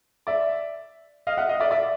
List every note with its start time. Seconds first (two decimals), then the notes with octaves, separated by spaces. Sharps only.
0.27 D5 E5
1.27 D#5 F5
1.37 E5 F#5
1.49 D#5 F5
1.60 D5 E5
1.71 D5 E5